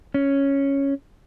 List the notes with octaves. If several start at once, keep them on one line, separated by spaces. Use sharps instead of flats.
C#4